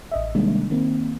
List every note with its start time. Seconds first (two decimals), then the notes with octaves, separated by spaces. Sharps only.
0.12 A1 D#5 E5
0.35 C3 D#3 G3 G#3 A#3 D4
0.70 D#3 A#3 C4